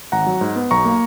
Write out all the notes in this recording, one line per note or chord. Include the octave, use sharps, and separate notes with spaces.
G#1 F#5 A#5
F#3
G#2
B3
B1 A#5 C#6
A#3